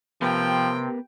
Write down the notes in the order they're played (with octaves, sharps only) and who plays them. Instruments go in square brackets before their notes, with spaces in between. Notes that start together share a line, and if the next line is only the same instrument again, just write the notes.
[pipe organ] C3 [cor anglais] F3 [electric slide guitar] B3 A#4 B4 [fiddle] G5